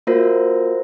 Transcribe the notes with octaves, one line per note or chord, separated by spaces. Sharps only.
A#3 F4 F#4 A#4 C5 A#6